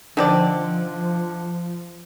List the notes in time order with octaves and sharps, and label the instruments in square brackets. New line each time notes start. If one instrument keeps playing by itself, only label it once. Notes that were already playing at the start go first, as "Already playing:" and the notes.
[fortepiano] D3 [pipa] D#3 C4 D5 [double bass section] F3